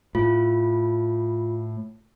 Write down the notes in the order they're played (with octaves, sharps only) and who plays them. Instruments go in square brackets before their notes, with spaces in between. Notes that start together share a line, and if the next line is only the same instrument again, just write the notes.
[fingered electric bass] A2 [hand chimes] F4